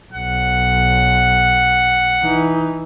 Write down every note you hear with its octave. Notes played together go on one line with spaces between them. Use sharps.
B1 F#5
E3 D#4